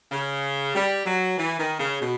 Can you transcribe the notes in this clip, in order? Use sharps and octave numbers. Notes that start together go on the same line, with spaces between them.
C#3
G3
F#3
E3
D#3
C#3
B2